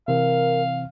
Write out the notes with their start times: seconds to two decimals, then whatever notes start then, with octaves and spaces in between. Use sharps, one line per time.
0.08 C3 E3 C4 A#4 F5